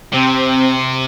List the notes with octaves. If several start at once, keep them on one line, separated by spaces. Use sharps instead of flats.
C3 C4